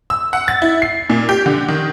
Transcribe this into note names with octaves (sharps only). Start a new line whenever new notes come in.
E6
F#5
A6
E4
C7
A#2
G4
D3
D#3